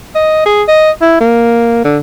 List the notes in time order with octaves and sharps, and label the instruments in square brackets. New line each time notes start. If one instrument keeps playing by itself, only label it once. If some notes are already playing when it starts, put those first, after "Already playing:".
[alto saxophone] D#5
G#4
D#5
E4
A#3
D3